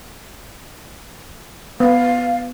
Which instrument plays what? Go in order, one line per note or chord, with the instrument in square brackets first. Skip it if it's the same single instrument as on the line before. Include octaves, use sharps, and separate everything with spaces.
[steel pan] B3 [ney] F5